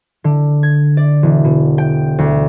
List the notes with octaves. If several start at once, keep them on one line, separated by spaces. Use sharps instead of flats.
D3
G#6
D5
E1
B2
G5
D2